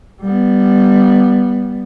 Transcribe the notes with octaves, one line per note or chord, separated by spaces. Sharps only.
G3 B3